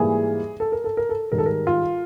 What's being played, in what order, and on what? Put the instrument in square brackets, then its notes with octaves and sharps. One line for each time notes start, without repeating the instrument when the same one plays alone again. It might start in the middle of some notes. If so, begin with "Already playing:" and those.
Already playing: [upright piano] G#2 E3 G3 A#3 G#4
A4
A#4
A4
A#4
A4
G#2 D#3 G3 A#4
A4
A#4
F4